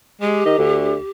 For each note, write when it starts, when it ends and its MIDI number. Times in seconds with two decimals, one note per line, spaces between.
0.22 0.44 56
0.22 1.10 67
0.46 0.57 51
0.46 0.58 75
0.58 0.95 38
0.58 0.95 50